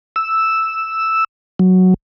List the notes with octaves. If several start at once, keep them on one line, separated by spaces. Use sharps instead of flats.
E6
F#3